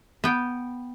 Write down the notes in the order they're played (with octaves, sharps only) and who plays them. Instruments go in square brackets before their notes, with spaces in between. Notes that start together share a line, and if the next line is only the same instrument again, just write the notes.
[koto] B3 G5